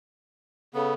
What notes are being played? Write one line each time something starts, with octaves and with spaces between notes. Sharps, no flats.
C#3 B3 A4